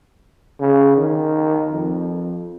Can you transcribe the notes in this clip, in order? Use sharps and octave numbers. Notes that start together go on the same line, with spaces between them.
C#3
D#3
F2